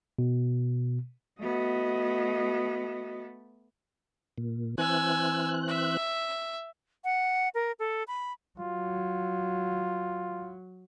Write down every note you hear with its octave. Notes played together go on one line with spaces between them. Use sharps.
B2
A3 B3 F#4 D#5
A#2
E3 C4 G#5 E6 F#6
E5
F#5
A#4
A4
B5
F#3 F4